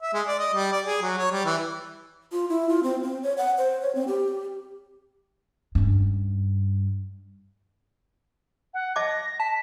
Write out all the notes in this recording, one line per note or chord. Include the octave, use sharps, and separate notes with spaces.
E5
G#3
D5
D#5
G3
D5
G#4
F#3
C#5
G3
E3
F4
E4
F4
C4
C4
C#5
F#5
C5
C#5
C4
G4
G2 C#4
F#5
D#5 A5 D6 A#6
A5 B6